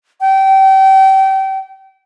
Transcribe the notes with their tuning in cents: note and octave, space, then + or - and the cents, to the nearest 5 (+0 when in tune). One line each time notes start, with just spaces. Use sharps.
G5 -30